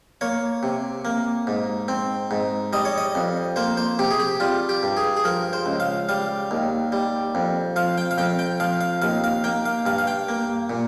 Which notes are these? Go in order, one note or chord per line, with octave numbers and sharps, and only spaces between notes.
A#3 C#5
C3
A#3
G#2
C4
G#2
G3 D#5
C#5
D#5
F2
A#3 C5
C5
C3 G4
G#4
G4
G3 F4
G4
G2
G#4
G#4
F3 A#4
C5
C#2
F5
G3 F5
D#2
G3
F2
F3 F5
G5
F5
F2 G5
G5
F3 F5
F5
D#2 F5
F5
A#3 G5
F5
G2 F5
F5
G5
A#3
A#2